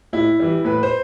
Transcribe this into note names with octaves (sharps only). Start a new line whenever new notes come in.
A2 E4
E3 G3
A2 B4
C5